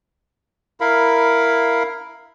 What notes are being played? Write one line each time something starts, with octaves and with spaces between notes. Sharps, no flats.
E4 A#4 F5 B5